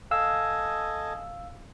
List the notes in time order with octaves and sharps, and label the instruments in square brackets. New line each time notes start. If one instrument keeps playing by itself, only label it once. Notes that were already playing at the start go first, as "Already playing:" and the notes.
[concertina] A4 D#5 G#5 [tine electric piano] F5 E6